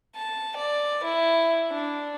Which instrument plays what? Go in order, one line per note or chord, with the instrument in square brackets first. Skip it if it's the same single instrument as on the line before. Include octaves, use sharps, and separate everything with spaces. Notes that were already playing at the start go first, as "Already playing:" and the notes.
[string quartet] A5
D5
E4
D4